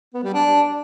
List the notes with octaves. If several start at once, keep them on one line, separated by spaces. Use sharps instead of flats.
B3
G3
D4